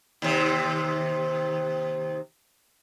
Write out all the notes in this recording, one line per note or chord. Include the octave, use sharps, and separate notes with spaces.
D#2 C3